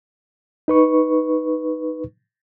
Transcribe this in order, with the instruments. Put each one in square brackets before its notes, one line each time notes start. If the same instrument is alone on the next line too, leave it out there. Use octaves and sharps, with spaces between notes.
[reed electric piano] D#4 B4 C#6